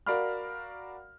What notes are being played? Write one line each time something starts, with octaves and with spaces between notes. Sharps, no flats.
F#4 A#4 D5 F5 B5 F6